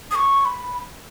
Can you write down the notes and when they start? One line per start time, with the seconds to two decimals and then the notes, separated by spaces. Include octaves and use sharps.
0.11 D#6
0.15 C#6
0.41 C#6
0.45 B5